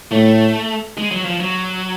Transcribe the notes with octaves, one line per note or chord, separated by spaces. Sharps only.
A2 A3
G#3
F#3
F3
F#3